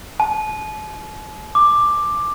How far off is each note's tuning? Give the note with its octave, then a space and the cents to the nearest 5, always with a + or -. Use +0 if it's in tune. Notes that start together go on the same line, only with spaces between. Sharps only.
A5 -45
D6 +10